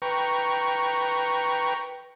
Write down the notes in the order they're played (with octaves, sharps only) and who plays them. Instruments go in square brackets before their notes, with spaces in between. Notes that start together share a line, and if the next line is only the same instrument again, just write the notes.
[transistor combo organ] B4 G5 A#5 C#6